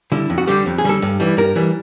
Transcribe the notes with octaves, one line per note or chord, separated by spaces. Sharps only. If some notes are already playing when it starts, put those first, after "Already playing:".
D3 G3 E4
F2
F#4
D3 G3 G4
F2
G#4
D3 G3 A4
G2
E3 G3
G2 A#4
E3 G3